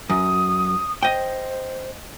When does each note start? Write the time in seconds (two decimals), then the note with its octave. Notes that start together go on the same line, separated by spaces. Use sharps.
0.10 F#2 D#6
1.03 C5 D#5 G5